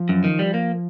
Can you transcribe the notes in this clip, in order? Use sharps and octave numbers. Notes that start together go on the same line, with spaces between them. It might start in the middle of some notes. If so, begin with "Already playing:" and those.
Already playing: F3
F#2
D#3
G3
A#3